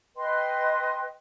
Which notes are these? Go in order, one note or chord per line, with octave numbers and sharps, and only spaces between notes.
B4 D#5 G5 C6